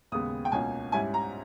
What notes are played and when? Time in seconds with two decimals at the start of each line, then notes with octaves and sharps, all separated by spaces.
0.12 D#2 C#3 G#3 B3 D#6
0.45 G5
0.52 C#2 B2 A#3 C#4 G#5
0.92 G#2 G3 C#4 E4 G#5
1.14 A#5